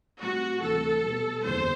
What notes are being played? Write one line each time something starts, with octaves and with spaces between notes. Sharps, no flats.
A2 G3 C4 F#4
D2 C3 E3 A4
B2 G3 B3
F#1 E2 D3 G3 D4 C5